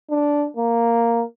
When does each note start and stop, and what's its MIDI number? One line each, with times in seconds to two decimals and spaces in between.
0.10 0.46 62
0.57 1.23 58